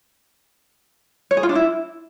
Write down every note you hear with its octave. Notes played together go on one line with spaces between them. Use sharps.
C#5
G#4
F4
D4
E4